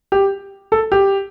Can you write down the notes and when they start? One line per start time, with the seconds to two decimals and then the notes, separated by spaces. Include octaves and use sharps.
0.12 G4
0.72 A4
0.92 G4